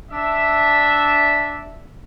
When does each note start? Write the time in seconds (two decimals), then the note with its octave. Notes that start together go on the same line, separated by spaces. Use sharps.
0.12 D4 E5